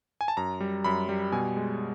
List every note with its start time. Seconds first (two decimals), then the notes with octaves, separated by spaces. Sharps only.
0.21 G#5
0.28 A5
0.37 F#2 A#5
0.60 G3
0.84 F#2 B5
1.09 G3
1.32 B2 G#5
1.57 G#3